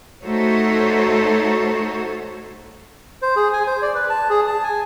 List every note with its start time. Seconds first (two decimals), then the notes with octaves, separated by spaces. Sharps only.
0.24 A3 D#4 F#4 A4 C5 C#5
3.22 C5
3.36 G#4
3.53 G#5
3.67 C5
3.82 D5
3.95 B4
4.10 A5
4.30 G#4
4.47 A5
4.64 G#5